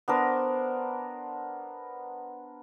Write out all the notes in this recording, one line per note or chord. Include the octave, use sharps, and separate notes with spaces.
B3 D4 A#4 C5